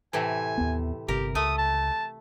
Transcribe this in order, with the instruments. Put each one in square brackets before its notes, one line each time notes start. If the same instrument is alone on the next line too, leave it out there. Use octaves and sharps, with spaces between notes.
[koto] A2 C3 E3 [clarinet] G#5
[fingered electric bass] D#2 B3
[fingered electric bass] G1 C3 [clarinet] G4 [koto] A#4
[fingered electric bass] C#2 [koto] A3 [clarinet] D#6
[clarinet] A5